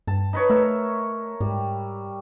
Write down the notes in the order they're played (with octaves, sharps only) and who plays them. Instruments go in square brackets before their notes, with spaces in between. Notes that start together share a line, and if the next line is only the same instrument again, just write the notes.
[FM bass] G2 [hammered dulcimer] A5
[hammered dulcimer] D#4 B4 C#5
[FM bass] A3 [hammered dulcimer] A#4 E5
[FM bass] G#2 [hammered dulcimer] G3